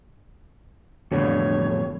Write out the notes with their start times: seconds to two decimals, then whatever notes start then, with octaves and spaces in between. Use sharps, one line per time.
1.12 E1 F2 A2 D3 C#5